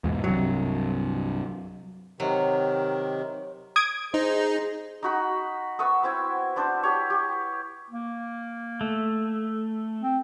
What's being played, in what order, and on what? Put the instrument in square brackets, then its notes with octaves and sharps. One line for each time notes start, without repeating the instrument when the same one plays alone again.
[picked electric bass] E2 G#2 B2
[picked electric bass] C2 G2 [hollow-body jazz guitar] F#3
[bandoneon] C3 D#3 [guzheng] F#3
[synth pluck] D#6 G#6 D7
[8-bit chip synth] D#4 [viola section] G#4 [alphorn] C5
[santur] D#4 F#4 B5
B3 E5 C#6 D#6
B3 C4 E4 E5
B3 D4 C5
G4 C#5
G4
[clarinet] A#3
[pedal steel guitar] A3
[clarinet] C4